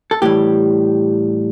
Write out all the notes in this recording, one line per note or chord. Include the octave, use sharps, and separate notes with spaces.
A4
A2 E3 G3 G4